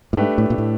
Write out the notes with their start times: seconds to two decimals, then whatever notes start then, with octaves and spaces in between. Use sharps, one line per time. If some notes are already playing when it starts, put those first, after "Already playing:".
0.13 A2
0.17 G#2 A3 D4 G4 B4
0.38 A2
0.50 A#2
0.58 A2